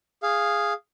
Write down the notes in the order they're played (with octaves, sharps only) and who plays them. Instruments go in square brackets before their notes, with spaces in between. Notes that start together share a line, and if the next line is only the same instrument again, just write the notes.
[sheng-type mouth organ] G#4 F5